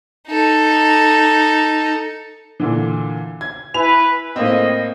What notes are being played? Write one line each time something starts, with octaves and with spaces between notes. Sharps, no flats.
D#4 A4
A#2 D3 E3
G#6
E4 B4 G#5 F7
A2 A#3 C4 D#5